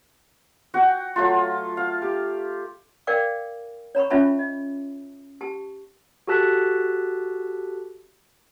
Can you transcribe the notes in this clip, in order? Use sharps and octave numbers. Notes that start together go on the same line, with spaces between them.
F#4 F#5 G5
F#3 A3 F4
F5
G4
A#4 D5 F5 G5 D6
C#5 A#5 B5 C#6
C#4 F4 C#5 E5 A5 B5
D#5
G4 A5
F#4 G4 A4 A5 F#6 B6